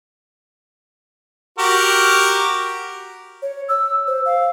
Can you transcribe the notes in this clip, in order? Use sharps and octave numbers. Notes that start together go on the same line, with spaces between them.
F#4 G4 A#4
C#5
E6
C5
F5